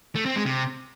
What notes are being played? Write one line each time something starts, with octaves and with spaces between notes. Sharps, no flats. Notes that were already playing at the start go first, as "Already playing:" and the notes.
A3
C4
G#3
C3